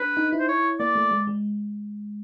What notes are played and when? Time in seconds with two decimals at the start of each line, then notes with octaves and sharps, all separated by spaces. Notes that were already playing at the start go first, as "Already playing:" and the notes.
Already playing: D4 B4
0.17 D#4
0.32 E4
0.39 C5
0.48 C#5
0.80 A#3 D5
0.95 A3
1.11 G#3
1.27 G#3